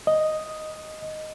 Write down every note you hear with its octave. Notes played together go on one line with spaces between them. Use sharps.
D#5